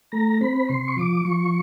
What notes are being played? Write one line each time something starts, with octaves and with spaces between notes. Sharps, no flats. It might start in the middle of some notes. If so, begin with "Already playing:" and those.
A3 A#5
C4 B5
C3 C6
C#6
F3 D6
F3 C#6